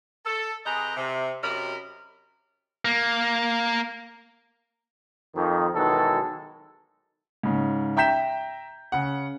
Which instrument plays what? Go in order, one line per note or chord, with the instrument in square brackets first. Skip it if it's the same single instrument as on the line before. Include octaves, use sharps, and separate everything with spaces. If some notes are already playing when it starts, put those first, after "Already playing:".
[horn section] A4
C3 G#4 B4 D#5 G5 A#5
C3
F#2 C3 A#4 D#5 B5
[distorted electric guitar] A#3
[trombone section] F2 D#3
B2 D#3 E3 F#3 G#3 A4
[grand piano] G#2 C#3
E5 G5 A#5 G6 B6 E7
C#3 F#5